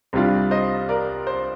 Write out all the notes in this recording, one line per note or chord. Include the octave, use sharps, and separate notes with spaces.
C2 C3 G3 D4 F4
C5 D#5
A#4 D5
C5